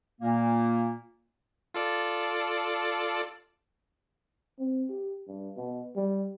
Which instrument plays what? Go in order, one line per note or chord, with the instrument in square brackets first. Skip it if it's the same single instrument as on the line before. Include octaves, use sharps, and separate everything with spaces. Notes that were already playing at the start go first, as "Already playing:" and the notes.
[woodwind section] A#2 A#3
[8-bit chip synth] F4 A4 D5
[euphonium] C4
G4
G2
B2
G3